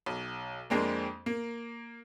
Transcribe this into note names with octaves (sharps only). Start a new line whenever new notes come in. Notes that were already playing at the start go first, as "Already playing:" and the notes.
B1
F2 G#3 A#3 C4 D4
A#3